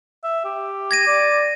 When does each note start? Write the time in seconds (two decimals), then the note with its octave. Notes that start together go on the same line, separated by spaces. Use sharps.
0.24 E5
0.45 G4
0.91 G#6 A#6 D#7
1.07 D5